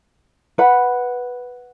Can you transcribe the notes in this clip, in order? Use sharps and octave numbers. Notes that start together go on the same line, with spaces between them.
B4 F#5 B5